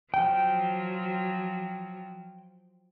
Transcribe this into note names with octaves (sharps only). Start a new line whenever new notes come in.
F3 F#3 G5